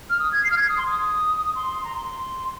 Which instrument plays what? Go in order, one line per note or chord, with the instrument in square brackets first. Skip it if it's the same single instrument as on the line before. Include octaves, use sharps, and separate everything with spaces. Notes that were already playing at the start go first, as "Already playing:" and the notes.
[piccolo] F6
D#6
G#6
C7
F6
G#6
D#6
C6
D#6
C6
A#5
C6